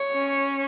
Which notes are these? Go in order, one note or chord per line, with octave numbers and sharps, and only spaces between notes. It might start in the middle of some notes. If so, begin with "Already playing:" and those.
Already playing: C#5
C#4